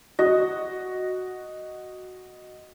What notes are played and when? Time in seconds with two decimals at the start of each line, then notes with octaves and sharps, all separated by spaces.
0.19 F#4 D#5